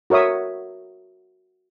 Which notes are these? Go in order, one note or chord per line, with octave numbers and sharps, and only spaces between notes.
F#4 A#4 C#5 E5 D#6